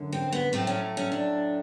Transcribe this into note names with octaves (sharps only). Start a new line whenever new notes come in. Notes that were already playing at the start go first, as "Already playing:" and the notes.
Already playing: F#2 D3
C4
B3
A2 F#3 A3 C4
C#4
C#4
D4